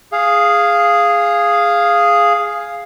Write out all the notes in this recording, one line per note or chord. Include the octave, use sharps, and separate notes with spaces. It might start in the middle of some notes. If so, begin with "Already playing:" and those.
G#4 F5